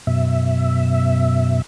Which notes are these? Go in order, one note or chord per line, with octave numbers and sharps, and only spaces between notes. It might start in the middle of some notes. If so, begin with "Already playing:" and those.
F#2 B2 E5